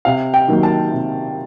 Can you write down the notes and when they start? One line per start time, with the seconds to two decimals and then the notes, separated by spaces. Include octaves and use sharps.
0.05 C3 F5
0.34 G5
0.48 D#3 F#3 A#3
0.63 A5
0.92 C3